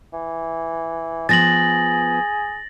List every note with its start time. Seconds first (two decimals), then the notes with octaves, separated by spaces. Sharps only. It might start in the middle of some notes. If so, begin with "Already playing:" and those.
0.13 E3
1.29 F3 B3 G#4 A6 A#6 F#7